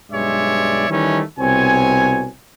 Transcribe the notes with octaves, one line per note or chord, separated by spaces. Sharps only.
B1 G2 G#3 C#5 D5 E5
D#3 E3 G3 A3 C#4 D#4
C2 B2 C4 C#5 G#5